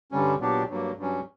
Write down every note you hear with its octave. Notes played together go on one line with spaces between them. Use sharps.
G2 D3 G3 C#4
A#2 F#3 B3 D4 G4
G2 F#3 A#3
G2 F#3 C#4